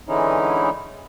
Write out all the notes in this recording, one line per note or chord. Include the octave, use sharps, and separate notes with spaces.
D3 E3 G#3 C#4 D#4 E4